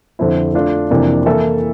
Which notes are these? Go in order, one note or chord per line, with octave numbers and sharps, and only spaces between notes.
F2 D3 F3 C4 E4
A3 D4 F4
F2 C3 E3 A#3 D4
E3 A#3 E4 A4 E5